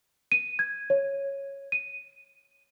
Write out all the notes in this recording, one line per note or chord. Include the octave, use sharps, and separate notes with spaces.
D#7
G#6
C#5
D#7